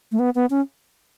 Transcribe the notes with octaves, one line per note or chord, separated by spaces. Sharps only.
A3
B3
B3
C#4